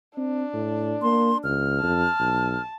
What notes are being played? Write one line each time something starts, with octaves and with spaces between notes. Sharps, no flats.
C4 D4
A2
A#3 C6
C#2 F6
F2 A5
B1